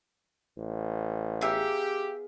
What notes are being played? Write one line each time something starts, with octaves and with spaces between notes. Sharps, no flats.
A1
B3 F4 G4 G#4 A#4 E5